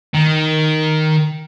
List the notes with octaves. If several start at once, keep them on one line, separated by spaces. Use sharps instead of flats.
D#3